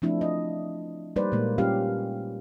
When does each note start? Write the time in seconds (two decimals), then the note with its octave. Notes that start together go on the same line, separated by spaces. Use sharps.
0.02 F3 A3 C4 D4 E4
0.21 D#5
1.16 G3 A#3 D#4 B4 C5 D5
1.32 A#2 G#3 A#3
1.58 G3 C#4 F4 G4 F5